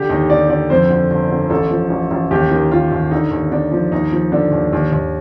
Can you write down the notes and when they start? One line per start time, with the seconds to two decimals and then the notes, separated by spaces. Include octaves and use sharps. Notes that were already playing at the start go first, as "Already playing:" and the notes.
Already playing: D3 G4
0.10 D#2 D#4
0.30 D3 D5
0.49 D3 D5
0.70 F2 C5
0.90 D3
1.10 G1
1.31 D3
1.50 A1 A4
1.71 F3
1.90 A1
2.11 A1
2.31 D#2 G4
2.51 D#3
2.71 D#3 F4
2.92 D#2
3.11 D3 D#4
3.31 D#2
3.52 D3 D4
3.72 F3
3.92 D#2 D#4
4.12 F3
4.32 D3 D4
4.51 D#2
4.73 D#2
4.92 D#2